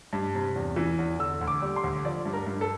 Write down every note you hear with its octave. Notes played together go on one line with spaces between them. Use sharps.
G2
C3
E2
E3
E2
D3 E6
D2
D6
G3
C6
D2
F3 D5
G2
A#4
G2
A4